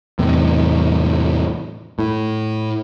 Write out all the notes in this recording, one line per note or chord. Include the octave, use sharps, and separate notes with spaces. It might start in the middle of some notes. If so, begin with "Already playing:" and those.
E2 A2 C3
A2